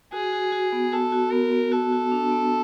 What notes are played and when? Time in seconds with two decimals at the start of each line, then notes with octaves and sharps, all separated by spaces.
0.12 F#4 G#4
0.33 F#4
0.52 F#4
0.72 B3
0.92 F#4 A4
1.12 F#4
1.32 B3 A#4
1.52 B3
1.72 F#4 A4
1.92 F#4
2.12 D4
2.32 B3